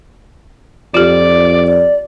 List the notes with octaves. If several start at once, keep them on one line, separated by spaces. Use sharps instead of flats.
F2 F4 G4 D5
D5